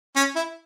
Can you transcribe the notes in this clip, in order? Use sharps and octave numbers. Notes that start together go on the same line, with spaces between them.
C#4
E4